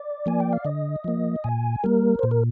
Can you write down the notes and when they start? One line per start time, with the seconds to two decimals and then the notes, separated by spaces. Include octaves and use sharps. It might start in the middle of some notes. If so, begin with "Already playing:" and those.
Already playing: D5
0.26 F3 A#3 G#5
0.40 G5
0.53 F5
0.65 D3 D#5
1.04 F3 A#3
1.44 A#2 G#5
1.83 G3 A#3 A#4
2.19 A#2 C5
2.31 A#4